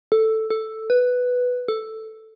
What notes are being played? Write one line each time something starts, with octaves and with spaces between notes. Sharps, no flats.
A4
A4
B4
A4